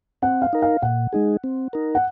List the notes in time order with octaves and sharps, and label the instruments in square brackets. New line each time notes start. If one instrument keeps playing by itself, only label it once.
[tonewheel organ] C4 [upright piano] F#5
[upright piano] F5
[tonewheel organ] D#4 A#4
[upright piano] F5
[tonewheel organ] A#2 [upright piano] F#5
[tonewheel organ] G#3 D#4 G#4
C4
D#4 A#4
[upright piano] F#5